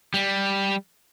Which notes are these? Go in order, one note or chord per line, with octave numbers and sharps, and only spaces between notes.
G3